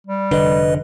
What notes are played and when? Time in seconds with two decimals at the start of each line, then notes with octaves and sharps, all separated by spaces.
0.07 G3
0.31 F1 B1 D3 B4 D#5